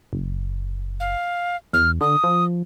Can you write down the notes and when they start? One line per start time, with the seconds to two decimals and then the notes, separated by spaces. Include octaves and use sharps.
0.13 F#1
1.00 F5
1.73 E2 F6
2.01 D3 D#6
2.24 F3